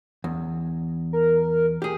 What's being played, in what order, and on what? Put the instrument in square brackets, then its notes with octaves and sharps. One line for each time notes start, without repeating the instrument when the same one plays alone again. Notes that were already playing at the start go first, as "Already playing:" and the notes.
[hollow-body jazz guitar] E2
[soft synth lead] A#4
[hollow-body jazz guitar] G4 G#4